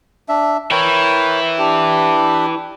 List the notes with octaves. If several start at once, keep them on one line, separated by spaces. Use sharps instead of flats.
D4 E5
E3 E4 A#4 C#5 G5
D4 G4